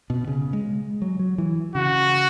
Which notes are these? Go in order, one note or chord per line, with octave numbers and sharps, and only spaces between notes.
B2
C#3
G#3
F#3
F#3
E3
C#3 F#4